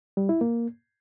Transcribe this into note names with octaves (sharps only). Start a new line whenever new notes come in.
G3
E4
A#3